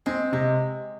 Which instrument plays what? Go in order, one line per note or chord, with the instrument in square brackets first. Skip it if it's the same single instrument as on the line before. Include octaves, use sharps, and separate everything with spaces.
[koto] G#3 [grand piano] C4
[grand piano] C3 [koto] G#3